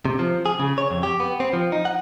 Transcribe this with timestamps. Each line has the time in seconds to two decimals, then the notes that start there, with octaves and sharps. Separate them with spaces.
0.05 C3
0.19 F3
0.46 G#4
0.59 C#3
0.78 C#5
0.91 F2
1.03 G4
1.20 B3
1.40 C4
1.53 F3
1.72 D#4
1.85 F#5